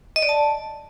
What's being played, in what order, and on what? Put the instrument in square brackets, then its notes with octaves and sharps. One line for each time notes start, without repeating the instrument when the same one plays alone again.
[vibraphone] D#5
D5
A5